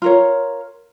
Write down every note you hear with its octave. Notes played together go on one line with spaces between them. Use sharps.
F4 A#4 C#5